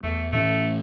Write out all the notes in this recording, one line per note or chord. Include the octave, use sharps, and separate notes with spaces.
E2 A3
A2 E3 A3 C#4